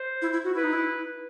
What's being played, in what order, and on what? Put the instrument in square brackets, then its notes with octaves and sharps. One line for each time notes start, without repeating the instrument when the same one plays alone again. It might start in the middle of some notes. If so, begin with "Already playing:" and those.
Already playing: [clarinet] C5
[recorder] E4
E4
F#4
[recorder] E4 [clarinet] B4
[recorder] D#4
E4